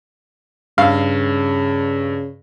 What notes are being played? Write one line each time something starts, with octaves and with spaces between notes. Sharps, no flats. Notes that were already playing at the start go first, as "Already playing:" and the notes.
G2 C#3 F5